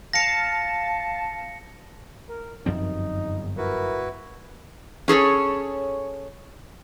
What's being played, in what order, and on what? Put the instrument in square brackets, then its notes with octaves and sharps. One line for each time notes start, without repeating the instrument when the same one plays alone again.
[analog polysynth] F5 A5 [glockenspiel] A#6 C#7
[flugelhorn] A#4
[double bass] G1 [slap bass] F#2 F3 C4 [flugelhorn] D#4
[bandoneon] E4 F#4 B4 [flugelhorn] A#4
[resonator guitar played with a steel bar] C#4 G#4 A4 C#5